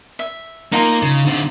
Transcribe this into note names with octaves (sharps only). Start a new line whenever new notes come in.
E5
A#3 D#4 F4 A#5
C#3
D3 C4